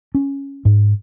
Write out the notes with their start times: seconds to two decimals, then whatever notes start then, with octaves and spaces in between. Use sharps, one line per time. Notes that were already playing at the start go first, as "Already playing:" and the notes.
0.15 C#4
0.65 G#2